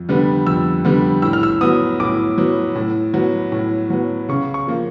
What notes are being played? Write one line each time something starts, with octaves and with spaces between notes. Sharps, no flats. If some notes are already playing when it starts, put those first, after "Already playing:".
Already playing: F2
D3 G3 B3
F2 E6
D3 G3 B3
A2 E6
F6
E6
F#3 B3 D#6
A2 D6
F#3 B3
A2
F#3 B3
A2
F#3 B3
C#3 C#6
C#6
F3 A#3